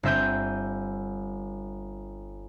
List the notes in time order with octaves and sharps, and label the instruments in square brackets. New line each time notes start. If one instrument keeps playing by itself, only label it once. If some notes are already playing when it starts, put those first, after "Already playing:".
[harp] G1 C4 E5 G6 D#7